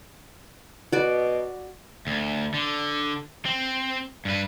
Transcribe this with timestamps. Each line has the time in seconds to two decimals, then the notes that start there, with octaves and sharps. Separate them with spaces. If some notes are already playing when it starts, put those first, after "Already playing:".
0.93 B2 F#4 D5
2.07 D2
2.54 D3
3.45 C4
4.25 G2 B4